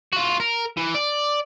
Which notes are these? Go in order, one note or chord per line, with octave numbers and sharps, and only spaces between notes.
F4 F#4
A#4
E3
D5